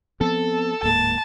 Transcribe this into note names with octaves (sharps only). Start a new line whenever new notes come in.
F3 B3 C4 A4
D1 G#2 A#3 A5